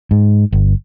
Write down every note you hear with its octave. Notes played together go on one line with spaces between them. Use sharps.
G#2
G1